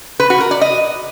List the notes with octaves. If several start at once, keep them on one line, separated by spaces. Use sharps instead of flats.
B4
F#4
A#4
D5
D#5